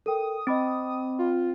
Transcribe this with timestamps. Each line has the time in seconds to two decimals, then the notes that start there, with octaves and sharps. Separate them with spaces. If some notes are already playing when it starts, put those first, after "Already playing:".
0.06 A4 A#4 G5 D#6
0.47 C4 D#5 B5 D6
1.19 F4